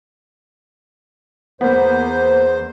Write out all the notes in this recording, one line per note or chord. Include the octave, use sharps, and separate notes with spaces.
E2 A#3 B3 C5